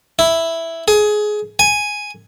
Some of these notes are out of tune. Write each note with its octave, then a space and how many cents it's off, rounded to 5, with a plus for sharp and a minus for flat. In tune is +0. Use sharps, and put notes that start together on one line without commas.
E4 +0
G#4 +20
G#5 +5